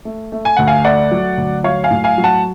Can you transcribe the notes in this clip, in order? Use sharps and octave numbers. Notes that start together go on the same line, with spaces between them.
A3
A3
G#5
D2 F#5
F5 G#5
A3 D5 F#5
F#3
D2
F#3 C#5 F5
F5 G#5
A2
F5 G#5
F#3
F#5 A5